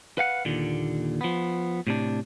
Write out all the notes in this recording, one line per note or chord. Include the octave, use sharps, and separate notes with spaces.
B4 F5 F#5
D#2 A#2 D3
F3 B3
A2 C3 D4